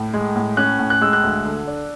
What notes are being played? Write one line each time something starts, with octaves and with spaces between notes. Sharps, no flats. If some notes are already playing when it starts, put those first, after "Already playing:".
Already playing: A2
G#3
A2
C#4 F#6
A2
F#6
G#3 E6
F#6
D2
D3
D4